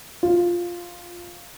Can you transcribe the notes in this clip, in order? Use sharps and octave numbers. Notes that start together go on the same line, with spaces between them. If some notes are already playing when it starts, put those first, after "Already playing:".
F4